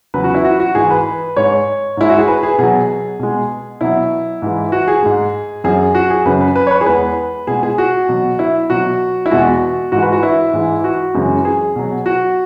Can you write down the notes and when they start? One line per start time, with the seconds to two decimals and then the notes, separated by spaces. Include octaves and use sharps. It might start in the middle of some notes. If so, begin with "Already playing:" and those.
0.14 E2 C#3 F#3 B4
0.24 F#4
0.34 E4
0.45 F#4
0.60 F#4
0.75 G#2 E3 G#3 G#4
0.90 B4
1.36 G#2 G#3 C#5
1.97 G#2 G#3 E4
2.09 F#4
2.19 G#4
2.28 B4
2.43 G#4
2.59 B2 F#3 G#4
3.19 B2 G#3
3.81 B2 F#3 E4
4.42 G#2 E3 G#3
4.72 F#4
4.88 G#4
5.03 G#2 G#3
5.64 F#2 F#3 G#4
5.95 F#4
6.10 G#4
6.25 F#2 C#3 F#3 B4
6.41 B4
6.56 B4
6.67 C#5
6.71 B4
6.81 G#4
6.86 E2 E3 G#3 B4
7.47 B2 G#3 G#4
7.63 G#4
7.78 F#4
8.09 B2 F#3
8.39 E4
8.70 B2 F#3 F#4
9.26 E4
9.31 E2 B2 G#3 F#4
9.92 G#2 E3 G#3 F#4
10.03 B4
10.12 F#4
10.23 E4
10.53 G#2 E3 G#3
10.84 F#4
11.14 F#2 C#3 E3 G#3
11.45 G#4
11.76 B2 F#3
12.06 F#4